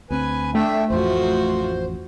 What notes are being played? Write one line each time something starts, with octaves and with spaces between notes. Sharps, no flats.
D2 C4 B4 G#5
A3 D4 E5 G5
A1 F2 F4 F#4 C5